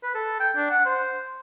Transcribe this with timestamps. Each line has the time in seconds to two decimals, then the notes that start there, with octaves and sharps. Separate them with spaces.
0.03 B4
0.14 A4
0.40 G5
0.56 D4
0.70 F#5
0.85 C5